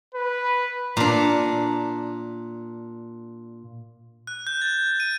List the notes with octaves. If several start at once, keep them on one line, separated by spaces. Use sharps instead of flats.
B4
A#2 D4
F#6
G6
A6
D#7